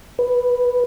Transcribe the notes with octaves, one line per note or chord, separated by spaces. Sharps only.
B4